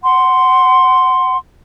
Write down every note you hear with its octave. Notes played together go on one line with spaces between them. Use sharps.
F#5 C6